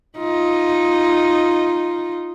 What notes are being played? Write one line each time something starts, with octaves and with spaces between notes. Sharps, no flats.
D#4 F4